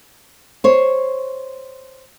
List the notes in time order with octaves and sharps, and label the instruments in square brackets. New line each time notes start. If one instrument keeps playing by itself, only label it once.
[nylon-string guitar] C5 C#5